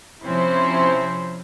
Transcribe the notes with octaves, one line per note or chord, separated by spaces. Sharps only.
C3 F3 C4 C#4 E4 C5